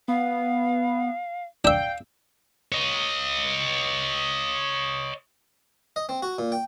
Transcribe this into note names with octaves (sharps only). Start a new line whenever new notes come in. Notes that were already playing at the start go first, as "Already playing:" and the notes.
B3 F5
D4 E5 F5 G5
C#5 D#5
D#5
C4
F#4
A#2
G5